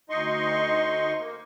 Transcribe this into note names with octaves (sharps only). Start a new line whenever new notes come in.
D2 D#4 D#5 C6 C#6
A#3